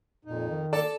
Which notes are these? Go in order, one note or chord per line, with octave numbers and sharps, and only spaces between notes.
F2 A#2 D#4
D#3
A#3 A4 D5